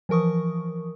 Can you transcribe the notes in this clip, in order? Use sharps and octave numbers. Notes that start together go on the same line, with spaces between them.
E3 F3 A#4 C#6 D#6